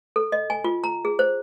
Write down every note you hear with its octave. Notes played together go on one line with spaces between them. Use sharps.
A4
D#5
G#5
F4
A#5
G#4
C5